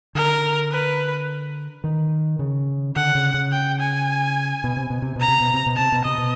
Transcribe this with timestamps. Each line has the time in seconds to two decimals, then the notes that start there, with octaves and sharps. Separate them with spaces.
0.15 D3 A#4
0.71 B4
1.84 D#3
2.39 C#3
2.95 D3 F#5
3.15 C#3
3.34 C#3
3.52 G5
3.80 G#5
4.64 B2
4.77 C3
4.90 B2
5.02 C3
5.16 B2 A#5
5.28 C3
5.41 B2
5.54 C3
5.66 B2
5.76 C3 A5
5.92 B2
6.05 C3 D#5
6.18 B2